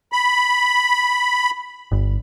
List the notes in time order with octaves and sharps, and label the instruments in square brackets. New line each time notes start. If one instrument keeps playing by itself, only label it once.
[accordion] B5
[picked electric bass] G1